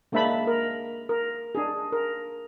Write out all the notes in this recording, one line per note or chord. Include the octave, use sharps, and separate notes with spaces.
G#3 A#3 D4 E5 A5 B5
A#4
A#4
D4 G#4
A#4